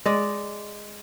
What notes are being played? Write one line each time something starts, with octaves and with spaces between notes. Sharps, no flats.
G#3 D5